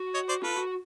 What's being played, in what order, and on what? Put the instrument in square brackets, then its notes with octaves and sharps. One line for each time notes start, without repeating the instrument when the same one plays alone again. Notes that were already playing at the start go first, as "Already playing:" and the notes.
Already playing: [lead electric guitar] F#4
[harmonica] C#5 D#5
C5 D5
[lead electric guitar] F4 [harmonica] A4 B4
[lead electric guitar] F#4